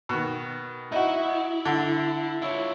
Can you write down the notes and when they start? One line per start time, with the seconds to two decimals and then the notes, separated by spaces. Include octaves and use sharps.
0.09 B2 D#3
0.92 D#4 E4 F#4
1.65 D3
2.42 E4 F4 C#5